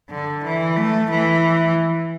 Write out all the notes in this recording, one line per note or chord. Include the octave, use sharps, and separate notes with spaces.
D3
E3
A3
E3